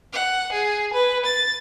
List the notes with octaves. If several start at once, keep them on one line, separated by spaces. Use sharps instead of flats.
F#5
G#4
B4
A6